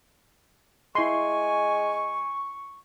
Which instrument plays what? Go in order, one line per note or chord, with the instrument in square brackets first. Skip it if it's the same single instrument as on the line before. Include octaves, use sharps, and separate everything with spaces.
[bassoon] G#3 [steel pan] E4 C6 [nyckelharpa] G#5 [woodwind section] C#6